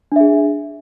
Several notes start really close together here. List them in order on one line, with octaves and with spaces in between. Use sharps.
D4 E5 G#4